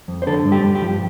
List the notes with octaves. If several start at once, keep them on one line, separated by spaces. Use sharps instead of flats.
F2
C5
D3 A4
G2
G4
G2
G4
F3